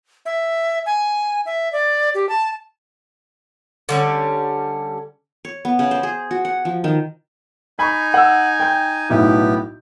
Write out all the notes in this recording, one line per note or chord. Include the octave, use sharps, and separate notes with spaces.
E5
G#5
E5
D5
G4
A5
D3 G3 C#4
C#5
B3
C#3
C5
G#4
F#4
F#5
F3
D#3
D#4 G#5 B5 C#6
F#5 E6
G5 G6
B1 A2 B3 E4 G4